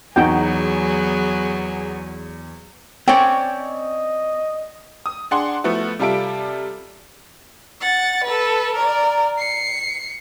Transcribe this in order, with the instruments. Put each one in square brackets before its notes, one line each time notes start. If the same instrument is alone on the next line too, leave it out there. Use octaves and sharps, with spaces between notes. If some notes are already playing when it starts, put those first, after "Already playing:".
[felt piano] E2 [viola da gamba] F#3 B3 G#4 [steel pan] D#4 F#4 G5
[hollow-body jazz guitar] C4 [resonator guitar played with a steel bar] C#4 C#5 D5 [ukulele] G5
[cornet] D#5
[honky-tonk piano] D#6
D4 G#4 F#5 C6
F3 A3 B3 E4 F#4
C3 G3 F4 A4 E5 D7
[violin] F#5 A6
A4 B4
A#4 D5
C7 C#7